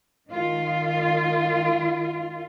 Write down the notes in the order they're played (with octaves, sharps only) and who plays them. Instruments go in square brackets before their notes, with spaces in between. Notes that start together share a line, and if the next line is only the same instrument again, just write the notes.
[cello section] D#3 F4